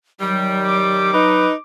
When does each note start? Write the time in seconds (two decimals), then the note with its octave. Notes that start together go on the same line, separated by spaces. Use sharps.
0.20 D#3 F#3 G3
0.66 D6
1.14 D#4 B4